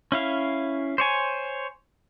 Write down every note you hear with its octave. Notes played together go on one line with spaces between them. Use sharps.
C#4 E4 F5
C5 C#5 G#5